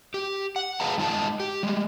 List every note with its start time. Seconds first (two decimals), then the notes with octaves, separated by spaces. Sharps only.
0.14 G4
0.56 F#5
0.80 G#4 B4 D#5 F5 A5 A#5
0.98 G2 G#3 D#4 F4 D#5 A5
1.40 G4
1.63 G3 G#3